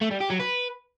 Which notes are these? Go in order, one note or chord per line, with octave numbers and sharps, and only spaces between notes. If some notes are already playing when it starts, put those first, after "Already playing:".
A3
G3
G4
F#3
B4